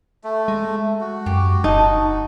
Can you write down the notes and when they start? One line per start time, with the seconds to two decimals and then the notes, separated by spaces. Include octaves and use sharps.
0.24 A3
0.48 G#3
1.01 F#4
1.26 F#2 G4
1.64 F1 D#4 A5